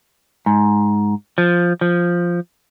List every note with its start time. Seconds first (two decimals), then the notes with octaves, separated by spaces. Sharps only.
0.46 G#2
1.38 F3
1.81 F3